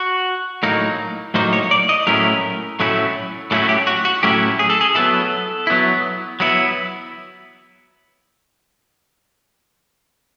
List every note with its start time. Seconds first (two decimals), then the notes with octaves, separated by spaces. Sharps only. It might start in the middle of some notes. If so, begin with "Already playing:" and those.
Already playing: F#4
0.63 A2 F#3 A#3 D#4
1.34 A2 F#3 A#3 D#4 C5
1.53 C#5
1.71 D5
1.89 D#5
2.07 A2 F#3 A3 C#4 E4 A#4
2.80 A2 F#3 A3 C#4 E4
3.51 A2 F#3 A3 C#4 E4 A4
3.63 F#4
3.69 G4
3.87 F#4
4.05 F#4
4.23 A2 F#3 A3 C#4 E4 G4
4.59 G#4
4.70 A4
4.81 G#4
4.95 F#3 B3 E4 A4
5.67 F#3 B3 E4
6.40 F#3 B3 E4